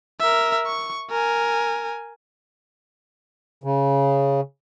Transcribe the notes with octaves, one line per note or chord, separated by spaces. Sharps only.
A#4 E5
C#6
A#4 G#5
C#3